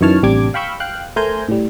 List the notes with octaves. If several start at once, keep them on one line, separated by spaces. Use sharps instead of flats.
F#2 D#3 E3 C#5 A5 F6
A1 C3 G3 D4 D6 G#6
F5 G5 B5 C#6 E6 G6
F5 G5 F#6
A3 A#4 C5 G#5 A#5 G6
A2 G3